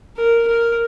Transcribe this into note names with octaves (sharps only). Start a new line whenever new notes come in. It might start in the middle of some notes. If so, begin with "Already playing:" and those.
A#4
A#4